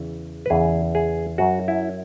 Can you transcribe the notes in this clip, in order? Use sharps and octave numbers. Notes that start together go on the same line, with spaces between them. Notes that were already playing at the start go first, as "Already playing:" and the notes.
Already playing: E2 C#3 E3
B4
E2 C#3 E3 G#4
G#4
F#2 F#3 F#4
E4